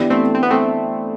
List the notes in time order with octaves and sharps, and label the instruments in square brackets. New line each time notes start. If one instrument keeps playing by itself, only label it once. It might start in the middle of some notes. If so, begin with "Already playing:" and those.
Already playing: [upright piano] E3 B3 D4 G4
[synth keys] A3 C4
C4
B3
A3 C4